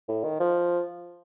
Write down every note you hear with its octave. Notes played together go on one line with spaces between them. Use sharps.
A2
D#3
F3